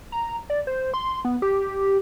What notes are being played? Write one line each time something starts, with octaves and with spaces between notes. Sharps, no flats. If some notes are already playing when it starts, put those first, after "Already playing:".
A#5
D5
C5
C6
B3
G4